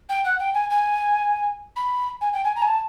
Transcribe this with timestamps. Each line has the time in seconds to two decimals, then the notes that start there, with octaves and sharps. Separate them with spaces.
0.09 G5
0.24 F#5
0.39 G5
0.54 G#5
0.70 G#5
1.76 B5
2.21 G#5
2.33 G5
2.44 G#5
2.55 A#5
2.62 G#5
2.67 A5